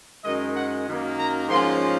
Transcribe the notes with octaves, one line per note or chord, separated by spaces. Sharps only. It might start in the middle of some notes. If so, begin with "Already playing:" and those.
F#2 D#3 G#3 D#5
F#5
F#2 D#3 A#3
A#5
G#2 F3 A#3 C#4 F4 C6